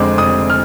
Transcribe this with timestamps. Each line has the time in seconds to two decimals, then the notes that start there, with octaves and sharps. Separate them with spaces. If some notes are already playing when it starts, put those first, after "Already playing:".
Already playing: F1 F2 D3 G#3 C4 D6
0.18 F1 D#6
0.50 F6